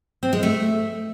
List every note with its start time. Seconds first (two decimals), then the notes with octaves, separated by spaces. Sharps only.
0.23 C4
0.33 G#3
0.43 A3